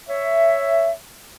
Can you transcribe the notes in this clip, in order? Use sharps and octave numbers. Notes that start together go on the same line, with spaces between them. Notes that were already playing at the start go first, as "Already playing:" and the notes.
C#5 E5